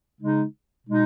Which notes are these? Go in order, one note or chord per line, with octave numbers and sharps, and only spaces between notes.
C#3 G#3 D#4
B2 G#3 D#4